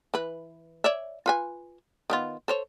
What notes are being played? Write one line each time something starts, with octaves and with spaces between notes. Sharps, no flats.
E3 B4
C#5 D5 E5
F4 B4 G#5
D#3 B3 F4
A4 C5 C#5